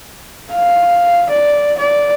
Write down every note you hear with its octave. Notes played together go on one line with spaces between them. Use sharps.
F5
D5
D5